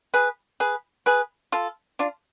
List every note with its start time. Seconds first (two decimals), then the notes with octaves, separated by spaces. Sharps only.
0.14 G#4 B4
0.60 G#4 B4
1.06 G#4 B4
1.52 F4 A4
1.99 D4 F4